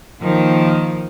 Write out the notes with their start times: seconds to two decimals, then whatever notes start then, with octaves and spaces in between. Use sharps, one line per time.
0.21 D#3 F3 A#3